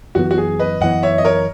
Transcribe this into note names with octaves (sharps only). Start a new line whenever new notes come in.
F#2 E3 B3 F#4
F#4
G#4
B4 D#5
F#2 E3 B3 D#5 F#5
C#5 E5
D#5
A#4 C#5